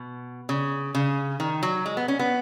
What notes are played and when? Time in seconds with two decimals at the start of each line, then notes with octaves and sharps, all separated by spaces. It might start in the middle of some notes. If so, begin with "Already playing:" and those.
Already playing: B2
0.49 C#3
0.95 C#3
1.40 D#3
1.63 F#3
1.86 G#3
1.97 B3
2.08 C#4
2.19 B3